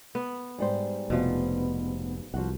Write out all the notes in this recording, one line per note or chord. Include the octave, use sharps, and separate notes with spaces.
B3
G#2 G3 C5
F1 B2 F3 B3
C2 F3 F#4 F#5